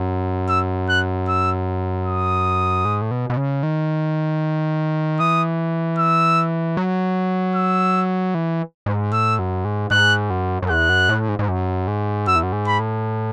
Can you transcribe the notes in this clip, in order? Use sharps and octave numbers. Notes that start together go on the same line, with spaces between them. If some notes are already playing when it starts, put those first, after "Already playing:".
Already playing: F#2
E6
F#6
E6
D#6
G#2
A2
B2
B2
C#3
D#3
E3 D#6
E6
F#3
E6
E3
G#2
A2 E6
F#2
G#2
G#2 F#6
F#2
F#2
E2 F#6
F#2
A2
G#2
G#2
F#2
G#2
F#2 E6
E2
F#2
G#2
B5
A2